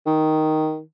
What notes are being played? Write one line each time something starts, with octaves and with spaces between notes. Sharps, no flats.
D#3